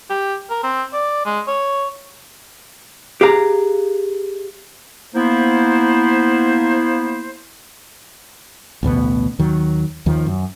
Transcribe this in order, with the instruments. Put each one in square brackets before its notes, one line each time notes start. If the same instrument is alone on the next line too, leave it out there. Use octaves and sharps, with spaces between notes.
[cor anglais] G4
A#4
C4
D5
G#3
C#5
[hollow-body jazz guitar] G4 G#4 F5 A#5
[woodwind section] A#3 B3 E4 C5
[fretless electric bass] A1 D2 B2 B3
D#2 D#3 F#3
D#2 D#3 F3
F#2